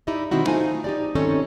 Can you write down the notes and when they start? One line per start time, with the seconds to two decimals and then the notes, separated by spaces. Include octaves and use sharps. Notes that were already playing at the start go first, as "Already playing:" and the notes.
0.07 D#4 E4 G4 D5 D#5
0.31 B2 D#3 C4 D#4 E4 F#4
0.46 A3 D#4 F4 C5 G#5
0.84 D#4 G4 D5
1.15 D#3 C4 C#4 D#4 A4 C#5